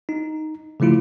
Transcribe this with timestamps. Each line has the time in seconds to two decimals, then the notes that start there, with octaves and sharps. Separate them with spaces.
0.09 D#4
0.80 C#3 F3 A3 E4 F4